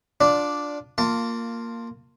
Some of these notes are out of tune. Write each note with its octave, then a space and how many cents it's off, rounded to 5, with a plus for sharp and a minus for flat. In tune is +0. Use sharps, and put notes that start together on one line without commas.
D4 -5 F4 +20 D5 -5
A#3 -10 F4 +0 A5 +25